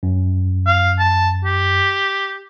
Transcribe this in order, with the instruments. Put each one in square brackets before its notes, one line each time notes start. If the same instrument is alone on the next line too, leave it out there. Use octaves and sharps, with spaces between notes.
[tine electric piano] F#2
[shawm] F5
A5
G4